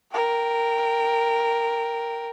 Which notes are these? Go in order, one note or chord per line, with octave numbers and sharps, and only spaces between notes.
A#4 G5